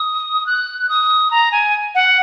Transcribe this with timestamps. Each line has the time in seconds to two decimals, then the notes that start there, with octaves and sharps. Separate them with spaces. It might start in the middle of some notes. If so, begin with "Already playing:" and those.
Already playing: D#6
0.46 F#6
0.89 D#6
1.31 A#5
1.52 G#5
1.95 F#5